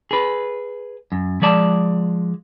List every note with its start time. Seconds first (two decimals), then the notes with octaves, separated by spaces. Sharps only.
0.11 G#4 B4
1.12 F#2
1.42 F3 G#3 D5 A5